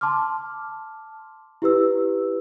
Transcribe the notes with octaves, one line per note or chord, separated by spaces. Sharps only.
A5 C6 D6 F6
E4 G4 B4 E6